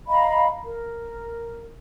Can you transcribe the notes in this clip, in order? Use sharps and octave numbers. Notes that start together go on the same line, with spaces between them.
D#5 F5 A#5 B5
A#4